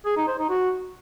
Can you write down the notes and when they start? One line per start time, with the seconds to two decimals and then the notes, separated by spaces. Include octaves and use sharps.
0.06 G#4
0.17 D#4
0.28 C5
0.39 D#4
0.49 F#4